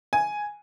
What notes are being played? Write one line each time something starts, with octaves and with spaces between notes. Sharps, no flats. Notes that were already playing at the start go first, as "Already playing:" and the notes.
G#5